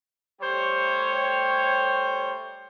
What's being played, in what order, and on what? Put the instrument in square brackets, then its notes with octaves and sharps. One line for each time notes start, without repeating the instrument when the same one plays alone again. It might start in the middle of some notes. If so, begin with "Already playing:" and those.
[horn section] G3 A3 G4 C5 C#5